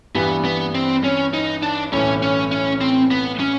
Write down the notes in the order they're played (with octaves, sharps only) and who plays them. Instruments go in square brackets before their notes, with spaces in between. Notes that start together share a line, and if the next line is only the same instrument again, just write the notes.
[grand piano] G2 E3 G3 [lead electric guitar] B3
[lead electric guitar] B3
C4
C#4
D#4
D4
[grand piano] B1 A2 E3 [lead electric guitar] C#4
[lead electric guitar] C#4
C#4
C4
B3
C#4